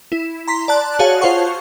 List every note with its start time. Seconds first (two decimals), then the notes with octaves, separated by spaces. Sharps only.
0.12 E4
0.48 A#5 C6 B6
0.68 D5 A5 F#6
0.99 F#4 G#4 C#5 F5 A5
1.21 F4 C5 C#5 F#5 C#6